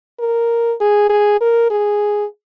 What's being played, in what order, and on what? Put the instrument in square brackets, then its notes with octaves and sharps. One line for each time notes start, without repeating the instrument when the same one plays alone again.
[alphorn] A#4
G#4
G#4
A#4
G#4